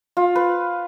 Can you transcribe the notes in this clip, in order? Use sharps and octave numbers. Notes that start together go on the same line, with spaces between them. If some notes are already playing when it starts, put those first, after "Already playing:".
F4
B4